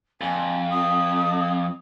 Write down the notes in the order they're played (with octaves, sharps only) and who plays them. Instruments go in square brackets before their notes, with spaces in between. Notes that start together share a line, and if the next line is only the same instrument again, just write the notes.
[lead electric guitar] F2 [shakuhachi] G#5
[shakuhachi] D#6